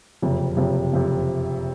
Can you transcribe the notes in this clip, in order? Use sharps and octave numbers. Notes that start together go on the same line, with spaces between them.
F#1 F2 C3
F#1 F2 C3
F#1 F2 C3